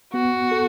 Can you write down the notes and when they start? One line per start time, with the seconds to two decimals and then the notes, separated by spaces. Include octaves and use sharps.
0.13 B3 F#4
0.51 A4